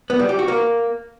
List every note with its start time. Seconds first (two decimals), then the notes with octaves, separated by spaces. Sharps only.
0.10 B3
0.19 G3
0.29 G4
0.39 F#4
0.48 A#3